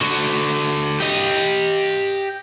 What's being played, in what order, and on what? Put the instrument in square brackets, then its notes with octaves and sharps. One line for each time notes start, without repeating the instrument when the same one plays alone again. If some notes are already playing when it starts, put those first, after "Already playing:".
[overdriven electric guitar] D3 F#4
G4 D#5